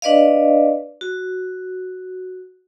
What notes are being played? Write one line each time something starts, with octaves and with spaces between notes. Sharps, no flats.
D4 B4 D5 D#5 F5
F#4